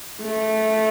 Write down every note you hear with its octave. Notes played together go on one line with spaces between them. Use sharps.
A3